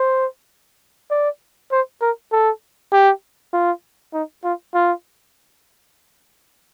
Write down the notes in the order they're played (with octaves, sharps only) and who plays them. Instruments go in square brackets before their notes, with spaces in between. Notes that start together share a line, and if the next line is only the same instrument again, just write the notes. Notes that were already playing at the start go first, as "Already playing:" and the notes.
Already playing: [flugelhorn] C5
D5
C5
A#4
A4
G4
F4
D#4
F4
F4